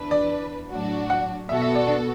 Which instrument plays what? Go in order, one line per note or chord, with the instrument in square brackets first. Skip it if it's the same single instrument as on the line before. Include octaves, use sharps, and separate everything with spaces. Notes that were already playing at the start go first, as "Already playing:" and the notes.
Already playing: [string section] E2 E3 D4 B4
[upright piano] D5
[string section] A2 F#3 D4 F#4
[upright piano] F#5
[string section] B2 B3 F#4 A4 [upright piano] E5
[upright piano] E5
D5
D4